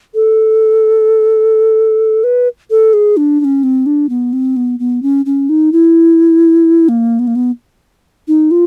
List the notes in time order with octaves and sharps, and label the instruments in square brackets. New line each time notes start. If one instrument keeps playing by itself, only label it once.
[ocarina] A4
B4
A4
G#4
D4
D4
C#4
C4
D4
B3
C4
B3
B3
C#4
C#4
D#4
E4
A#3
B3
A#3
B3
D#4
F4